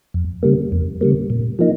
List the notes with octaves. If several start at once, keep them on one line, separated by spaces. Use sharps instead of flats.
F2
C#3 G3 A#3
F2
C#3 G3 A#3
A#2
F3 A#3 D#4